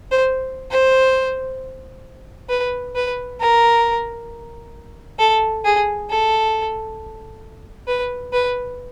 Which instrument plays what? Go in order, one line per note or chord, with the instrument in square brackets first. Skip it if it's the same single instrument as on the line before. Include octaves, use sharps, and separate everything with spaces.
[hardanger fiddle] C5
C5
B4
B4
A#4
A4
G#4
A4
B4
B4